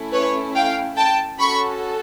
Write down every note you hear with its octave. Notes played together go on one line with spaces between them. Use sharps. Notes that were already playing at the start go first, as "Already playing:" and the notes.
Already playing: A3 C#4 E4
B4 C#5
F5 G5
G5 A5
C#4 F#4 A4 B5 C#6